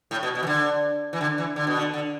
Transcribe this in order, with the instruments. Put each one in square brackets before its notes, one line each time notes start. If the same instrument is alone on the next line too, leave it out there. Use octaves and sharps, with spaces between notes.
[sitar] A2
B2
B2
E3
D3
E3
D3
E3
D3
B2
D3
D3